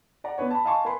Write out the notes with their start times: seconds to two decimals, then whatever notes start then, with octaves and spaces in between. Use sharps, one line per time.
0.24 D5 F#5 A#5
0.38 B3 D4 B4 C#5
0.51 A5 B5
0.65 D#5 F5 G#5 A5 C6 C#6
0.85 A#4 B4 G#5 B5 C6